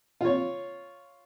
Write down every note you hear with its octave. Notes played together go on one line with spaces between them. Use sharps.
F4 C#5